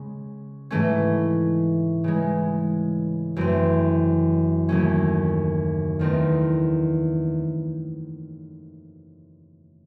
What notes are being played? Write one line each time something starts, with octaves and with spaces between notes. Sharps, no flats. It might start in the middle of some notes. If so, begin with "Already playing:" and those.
Already playing: C#3 G#3 C#4
G#2 E3 A3 C#4
C#3 E3 G#3
F#2 E3 A3 C4
D#2 C#3 F#3 A3 C#4
E2 D#3 A3 C4 D#4